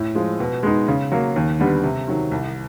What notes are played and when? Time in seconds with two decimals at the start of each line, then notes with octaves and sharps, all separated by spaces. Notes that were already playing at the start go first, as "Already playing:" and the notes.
Already playing: A2
0.15 F3 G#3
0.40 B2
0.63 G#3 B3 D#4
0.88 C#3
1.12 F#3 A#3
1.36 D#2
1.59 D3 G3 B3
1.84 C3
2.08 D#3 F#3
2.31 C2